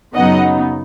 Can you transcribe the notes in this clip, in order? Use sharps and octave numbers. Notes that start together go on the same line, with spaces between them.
F#2 C#3 F#3 B3 D#4 D#5 F#5